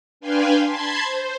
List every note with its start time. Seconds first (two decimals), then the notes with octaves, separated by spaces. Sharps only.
0.21 D4 B4 F5 G5 G#5 C6
0.64 A5 B5 C6 G#6
1.02 C5